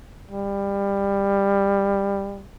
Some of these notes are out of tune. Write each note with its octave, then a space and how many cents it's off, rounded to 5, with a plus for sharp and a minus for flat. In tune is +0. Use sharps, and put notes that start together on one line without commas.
G3 +20